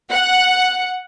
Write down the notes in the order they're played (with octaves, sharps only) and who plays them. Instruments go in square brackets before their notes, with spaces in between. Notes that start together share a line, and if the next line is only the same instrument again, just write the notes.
[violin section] F#5